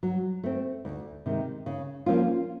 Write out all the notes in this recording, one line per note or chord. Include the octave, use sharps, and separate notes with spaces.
F#3
A3 C4
D2
C3 D#3 G#3
C#3
F3 A#3 C#4 F4